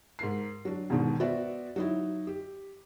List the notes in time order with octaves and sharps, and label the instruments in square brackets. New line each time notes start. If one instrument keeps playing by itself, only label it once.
[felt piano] G#2 A#4 C7
F#3 D4
E2 G#2 B2 D#3
B3 F#4 C5 D5 E5
F#3 D#4 E4
G4